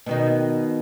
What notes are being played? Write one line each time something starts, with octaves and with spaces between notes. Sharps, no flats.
B2 D#3 D#4